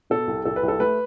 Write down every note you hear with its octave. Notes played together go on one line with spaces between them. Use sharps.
B2 A4
C2
C2 A4
B4
C2
A4
A3 B4